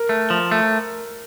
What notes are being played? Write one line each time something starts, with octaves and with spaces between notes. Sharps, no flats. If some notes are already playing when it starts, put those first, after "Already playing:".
Already playing: A#4
A3
F3
A3